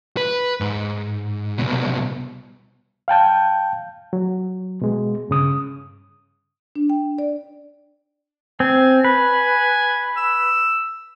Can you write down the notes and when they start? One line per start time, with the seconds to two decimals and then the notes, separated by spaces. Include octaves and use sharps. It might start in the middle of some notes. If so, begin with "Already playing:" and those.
0.17 B4
0.60 G#2
1.58 C2 B2
3.08 F5 G5 A5 G6
4.13 F#3
4.82 B2 G#3
5.30 G2 C#3 D#6
6.75 D4
6.90 G5
7.18 D5
8.60 C4 G#5
9.05 B4
10.17 E6